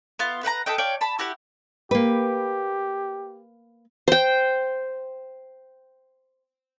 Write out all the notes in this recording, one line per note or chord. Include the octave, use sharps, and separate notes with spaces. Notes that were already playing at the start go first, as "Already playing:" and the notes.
B3 F4
B4 F#5 G5 A#5
A4 B4 D#5 G5
C#5 D5 F5 G5
A5 B5
E4 F#4 G4 F#5
A#3 G4 B4
C5 G5